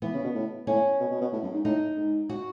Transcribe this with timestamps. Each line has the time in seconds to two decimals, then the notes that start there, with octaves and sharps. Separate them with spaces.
0.02 E3 B3
0.14 C#3
0.24 B2
0.34 A2
0.67 A2 C#4
1.00 B2
1.10 B2
1.21 B2
1.32 A2
1.43 F#2
1.53 G#2
1.65 A2 D#4
1.97 G#2
2.30 F#4